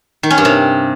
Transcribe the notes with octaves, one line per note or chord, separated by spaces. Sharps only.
D#3
C#4
G2
C3